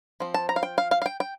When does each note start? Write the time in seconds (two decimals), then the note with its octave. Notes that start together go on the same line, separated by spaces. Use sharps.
0.20 F3 C4
0.34 A5
0.49 A#5
0.56 F5
0.63 G5
0.78 F5
0.91 F5
1.02 F5
1.06 G5
1.20 G5